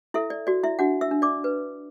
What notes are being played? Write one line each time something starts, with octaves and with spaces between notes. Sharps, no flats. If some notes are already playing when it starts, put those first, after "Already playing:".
E4 A4 E5
D5
F#4 D5
E4 E5
D4 F#4 F#5
E5 E6
D4
D5 D6
B4